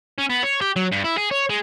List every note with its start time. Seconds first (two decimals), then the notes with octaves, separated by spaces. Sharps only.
0.18 C#4
0.29 B3
0.43 C#5
0.61 G4
0.76 F#3
0.92 G2
1.05 E4
1.18 G#4
1.31 C#5
1.49 G#3